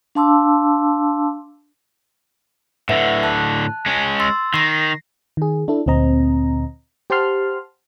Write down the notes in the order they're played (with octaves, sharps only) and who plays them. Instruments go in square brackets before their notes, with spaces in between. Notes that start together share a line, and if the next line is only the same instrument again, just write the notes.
[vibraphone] D4 F5 A5 C6 D6 E6
[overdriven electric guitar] A2 D3 [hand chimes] B4 E5 F#5
[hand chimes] A5 F#6
[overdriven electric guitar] G#3 C#4
[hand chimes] C6 E6 A6
[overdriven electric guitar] D#3 [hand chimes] A#6 C7
[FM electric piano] D#3 G#4
D4 E4 A4
D2 A#2 C4 D#5 A#5
G4 C5 F#5 A5 C6 F6